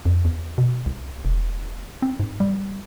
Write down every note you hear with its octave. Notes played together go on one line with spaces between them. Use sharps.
F2
E2
B2
C2
E1
C4
G#2
G3